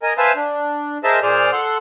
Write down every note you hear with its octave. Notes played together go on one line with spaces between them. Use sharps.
A#4 D#5 G#5
B4 C5 E5 F5 G#5 A5
D4
G#4 A#4 C5 D#5 E5 A5
A#2 G#4 C5 D5 F6
A4 F#5 C6